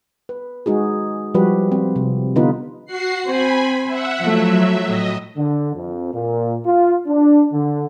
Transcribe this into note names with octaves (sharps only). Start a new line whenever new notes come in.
B4
G#3 D#4 F#4 G#4
F3 G3 F#4 G4 B4
C4
C3
D3 B3 D#4 F4 B4
F#4 F#5 C7
C4 C5 G#5 B5
E5 F#5
F3 F#3 A3 E5
A2 D#5
D3
F2
A#2
F4
D4
D3